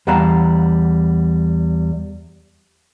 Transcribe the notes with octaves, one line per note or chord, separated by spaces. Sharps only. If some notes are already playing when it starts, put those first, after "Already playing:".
E2 G3 F5 F#5 A5 A#5